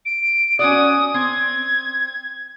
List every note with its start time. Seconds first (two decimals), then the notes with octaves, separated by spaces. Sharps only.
0.05 D7
0.59 C#4 F#4 D5 D#6
1.14 C4 G#6